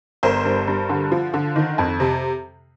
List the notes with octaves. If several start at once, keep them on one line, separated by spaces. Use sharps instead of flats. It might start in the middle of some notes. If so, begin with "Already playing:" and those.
G1 A#4 C5
G2
G2
D3
F3
D3
D#3
F2
C3